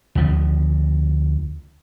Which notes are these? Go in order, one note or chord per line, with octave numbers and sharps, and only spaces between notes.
D2 C#3 F3